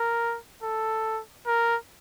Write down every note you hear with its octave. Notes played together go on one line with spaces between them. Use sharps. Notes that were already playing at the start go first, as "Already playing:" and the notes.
Already playing: A#4
A4
A#4